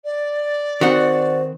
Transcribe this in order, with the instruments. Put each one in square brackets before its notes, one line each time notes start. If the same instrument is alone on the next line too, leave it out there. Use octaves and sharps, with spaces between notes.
[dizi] D5
[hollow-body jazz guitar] D#3 C4 [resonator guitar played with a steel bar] F#4 F#5 [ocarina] C5